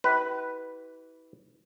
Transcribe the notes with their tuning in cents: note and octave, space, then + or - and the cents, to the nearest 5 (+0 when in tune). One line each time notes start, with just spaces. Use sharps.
E4 -35 G4 -40 B4 +0